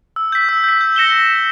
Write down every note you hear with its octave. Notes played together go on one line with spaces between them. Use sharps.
E6
G6 B6
E6
G6 B6
G6
A#6 C#7 E7 G7